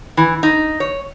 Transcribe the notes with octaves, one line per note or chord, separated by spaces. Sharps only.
E3
D#4
C#5